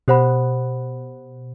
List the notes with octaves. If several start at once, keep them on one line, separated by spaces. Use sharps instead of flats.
B2 G4 C5 F#5 B5